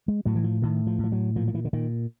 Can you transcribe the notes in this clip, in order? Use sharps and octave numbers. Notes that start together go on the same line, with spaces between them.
G#3
A2 F#3
E3
F3
A2 D#3
F3
A2 F3
F#3
A#2 F3
F3
E3
D3
A#2 D#3